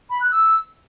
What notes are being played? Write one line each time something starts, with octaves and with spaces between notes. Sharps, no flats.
B5
F#6
E6